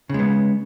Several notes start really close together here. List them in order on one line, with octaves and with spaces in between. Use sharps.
C#3 G#3 B3